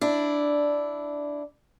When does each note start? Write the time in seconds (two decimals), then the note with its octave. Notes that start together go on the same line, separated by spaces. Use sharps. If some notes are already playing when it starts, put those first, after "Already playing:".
0.01 D4 E4